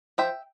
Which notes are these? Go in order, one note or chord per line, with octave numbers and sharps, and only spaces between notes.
F3 E5 G5